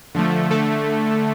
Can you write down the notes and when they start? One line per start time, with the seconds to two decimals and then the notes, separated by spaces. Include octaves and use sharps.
0.15 D3 F3 A3
0.51 D3 A3 A4